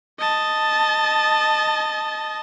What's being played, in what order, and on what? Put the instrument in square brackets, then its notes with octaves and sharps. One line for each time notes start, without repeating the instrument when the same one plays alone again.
[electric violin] D#5 A5